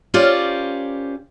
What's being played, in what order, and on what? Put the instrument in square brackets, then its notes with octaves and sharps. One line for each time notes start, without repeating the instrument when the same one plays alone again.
[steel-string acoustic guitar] C#4 F4 G4 A#4 C5 D5